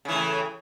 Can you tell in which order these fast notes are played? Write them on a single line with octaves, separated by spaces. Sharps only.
C#3 E3 A2